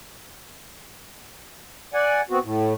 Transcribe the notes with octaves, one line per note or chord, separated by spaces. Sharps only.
D5 F#5 G#5
B3 C4 F#4
A2